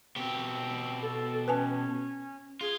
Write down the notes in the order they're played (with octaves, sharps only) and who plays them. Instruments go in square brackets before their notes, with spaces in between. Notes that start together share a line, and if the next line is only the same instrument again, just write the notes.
[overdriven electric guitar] B2 G4 [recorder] C4
[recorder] A4
[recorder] C#4 [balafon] B4 G#5 A5
[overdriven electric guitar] F4 [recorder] G#4